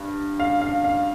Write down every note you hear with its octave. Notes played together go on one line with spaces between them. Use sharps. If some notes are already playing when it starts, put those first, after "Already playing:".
Already playing: G2
F5
F5
F5